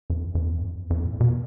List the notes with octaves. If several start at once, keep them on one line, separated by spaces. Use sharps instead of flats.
F2
F2
E2
G2
F2
E2
F2
A2
B2